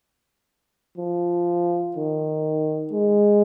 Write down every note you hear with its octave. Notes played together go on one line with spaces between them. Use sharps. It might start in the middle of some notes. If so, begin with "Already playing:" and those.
F3
D#3
G#3